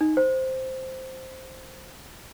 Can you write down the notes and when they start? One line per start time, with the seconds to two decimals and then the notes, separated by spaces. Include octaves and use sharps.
0.01 D#4
0.17 C5